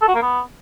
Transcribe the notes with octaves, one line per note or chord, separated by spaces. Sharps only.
A4
F#4
A#3
B3